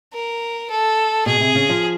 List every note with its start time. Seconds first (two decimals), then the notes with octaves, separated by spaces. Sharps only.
0.14 A#4
0.70 A4
1.26 B2 G#4
1.40 C3
1.55 C#3
1.69 F3